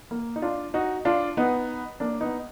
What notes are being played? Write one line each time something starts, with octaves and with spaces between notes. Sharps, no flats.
A#3
D#4
D4 F4
D#4 F#4
D4 F4
B3 D#4
A#3 D4
B3 D#4